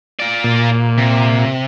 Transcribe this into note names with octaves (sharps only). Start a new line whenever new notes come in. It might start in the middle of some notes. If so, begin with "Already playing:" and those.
F4 D5
A#2
C3